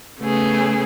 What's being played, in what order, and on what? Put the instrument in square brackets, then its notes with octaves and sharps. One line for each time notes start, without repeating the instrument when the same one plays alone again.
[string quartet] C#3 A3 B3 G#4